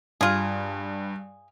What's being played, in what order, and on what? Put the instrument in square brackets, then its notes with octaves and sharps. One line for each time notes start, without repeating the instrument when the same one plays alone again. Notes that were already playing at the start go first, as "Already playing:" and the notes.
[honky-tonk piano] G2 [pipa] F4 G#4